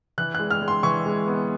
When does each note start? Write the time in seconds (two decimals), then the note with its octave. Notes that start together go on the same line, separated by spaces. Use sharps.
0.18 E3 F#6
0.35 G#3 F#6
0.51 F6
0.61 G#3
0.68 C6
0.83 E3 C#6
1.06 G#3
1.27 B3